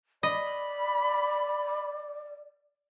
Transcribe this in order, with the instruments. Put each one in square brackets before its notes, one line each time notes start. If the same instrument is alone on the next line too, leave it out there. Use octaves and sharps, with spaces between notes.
[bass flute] D5 [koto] D#5 [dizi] B5